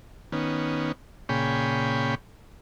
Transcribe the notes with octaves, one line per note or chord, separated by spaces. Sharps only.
D#3 B3 C#4
A#2 C#3 G#4 C#5 G5 B5